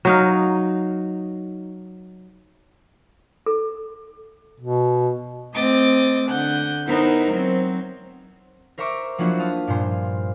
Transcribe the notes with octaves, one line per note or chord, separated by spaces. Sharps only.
F#3 D#4 F5
A4
B2
A3 C4 D#5 D6 A6
D3 F#5 G6
B3 D#4 E4 A#4 C5
F#3 C4
A#4 C5 E5 A#5 C#6 D6
F3 F#3 A#3 D4 E4 F#4
F5 A5 D#6
G2 A#2 C5